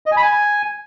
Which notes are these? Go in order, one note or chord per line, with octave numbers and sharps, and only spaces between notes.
D#5
G#5
B5
G#5